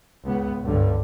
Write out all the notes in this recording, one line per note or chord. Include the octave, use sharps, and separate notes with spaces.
C#2 B3
C#2 G2 D3